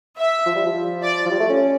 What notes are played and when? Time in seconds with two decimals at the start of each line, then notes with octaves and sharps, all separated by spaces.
0.18 E5
0.46 F3
0.56 G3
0.66 F3
1.03 D5
1.26 F3
1.31 G3
1.40 A3
1.50 C#4